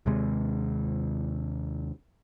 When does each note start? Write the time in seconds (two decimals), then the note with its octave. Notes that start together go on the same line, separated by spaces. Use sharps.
0.06 D#2 C3 G#3